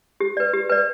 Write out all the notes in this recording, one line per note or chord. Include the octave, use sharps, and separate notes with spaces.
G4
B4 D5
G4
B4 D5